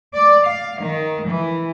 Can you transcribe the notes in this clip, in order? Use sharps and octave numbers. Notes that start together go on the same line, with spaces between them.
D5
F5
D#3
E3